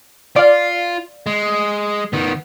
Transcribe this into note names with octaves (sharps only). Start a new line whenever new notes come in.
F4 D5 F5
G#3
D#3 B3